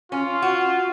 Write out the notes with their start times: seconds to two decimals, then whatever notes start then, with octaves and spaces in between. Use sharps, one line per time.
0.12 C#4 F4
0.42 F#4